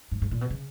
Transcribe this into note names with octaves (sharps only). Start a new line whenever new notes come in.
G#2
G#2
A#2
B2
C#3